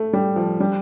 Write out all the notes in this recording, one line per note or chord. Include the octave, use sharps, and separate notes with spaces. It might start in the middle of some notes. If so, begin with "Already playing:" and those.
Already playing: A3
G3
F3
G3